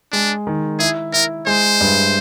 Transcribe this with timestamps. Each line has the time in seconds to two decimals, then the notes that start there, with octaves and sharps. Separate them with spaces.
0.12 G#3 D4
0.47 D#3
0.79 E4 G#4
1.13 E4 A#4
1.47 G#3 C5
1.81 G2